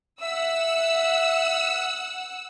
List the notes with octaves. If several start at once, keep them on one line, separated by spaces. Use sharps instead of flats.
E5 F#5 E6